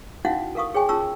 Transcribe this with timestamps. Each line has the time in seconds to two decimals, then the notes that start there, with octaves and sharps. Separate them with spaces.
0.25 C#4 D#4 E4 F#4 F5 F#5
0.55 A4 A#4 F5 C#6 D#6
0.74 G#4 C#5 G5 G#5 C#6
0.89 C#4 F4 A5 A#5 C#6 E6